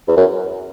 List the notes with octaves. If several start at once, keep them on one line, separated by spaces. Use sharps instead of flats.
E2
F#2